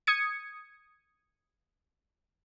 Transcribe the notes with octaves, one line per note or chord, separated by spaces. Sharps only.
D#6 G#6 C#7